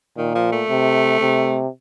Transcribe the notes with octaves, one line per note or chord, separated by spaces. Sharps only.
A#2 D#3
F3
A3
C3
C3